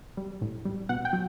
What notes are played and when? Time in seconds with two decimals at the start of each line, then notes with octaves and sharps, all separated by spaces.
0.17 G3
0.41 A2
0.65 G3
0.89 B2 F#5
1.05 G5
1.13 F#3